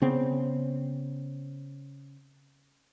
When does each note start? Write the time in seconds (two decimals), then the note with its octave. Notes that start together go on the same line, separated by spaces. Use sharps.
0.02 C#3 B3 C4